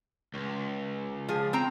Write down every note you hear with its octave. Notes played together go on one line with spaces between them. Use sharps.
C#2
F3 G#4
C4 G5 A#5